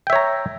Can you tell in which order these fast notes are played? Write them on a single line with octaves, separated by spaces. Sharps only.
G5 E5 C#5 A#5